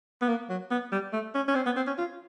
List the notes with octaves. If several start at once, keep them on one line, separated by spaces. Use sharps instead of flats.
B3
A#3
F#3
B3
G3
A3
C#4
C#4
C4
B3
C4
C#4
F4